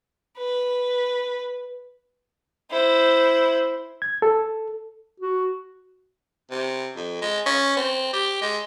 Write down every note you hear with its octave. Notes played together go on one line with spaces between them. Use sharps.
B4
E4 C5
G#6
A4
F#4
C3
F2
G#3
C#4
C4
G4
G#3